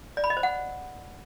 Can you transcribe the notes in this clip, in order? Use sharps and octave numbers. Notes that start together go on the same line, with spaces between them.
D5
B5
D#5
C5
F#5